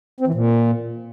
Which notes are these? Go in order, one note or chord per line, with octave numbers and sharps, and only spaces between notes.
C4
E3
A#2